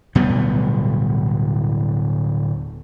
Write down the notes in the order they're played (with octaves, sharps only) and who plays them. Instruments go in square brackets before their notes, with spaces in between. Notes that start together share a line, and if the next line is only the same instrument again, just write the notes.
[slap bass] D1 B2 G3 B3